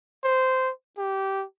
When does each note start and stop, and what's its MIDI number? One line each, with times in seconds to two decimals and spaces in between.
0.24 0.71 72
0.98 1.45 67